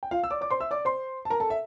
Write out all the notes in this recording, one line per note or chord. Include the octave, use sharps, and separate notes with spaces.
G5
F4 F5
E6
D5 D6
D5 D6
C5 C6
E5 E6
D5 D6
C5 C6
A5
A#4 A#5
A4 A5
E5